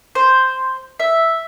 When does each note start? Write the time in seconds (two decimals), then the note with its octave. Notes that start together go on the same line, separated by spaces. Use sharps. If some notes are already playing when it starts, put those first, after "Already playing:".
0.15 C5
1.00 E5